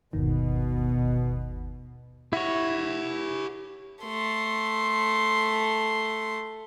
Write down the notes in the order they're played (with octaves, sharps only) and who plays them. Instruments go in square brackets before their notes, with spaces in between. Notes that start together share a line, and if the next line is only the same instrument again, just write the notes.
[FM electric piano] G1 D#2 D#3 [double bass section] B2
[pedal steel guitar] E4 C#5 [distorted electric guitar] G4 F#5
[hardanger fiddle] A3 C6